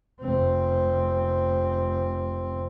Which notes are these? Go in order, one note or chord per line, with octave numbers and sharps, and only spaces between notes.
F1 C4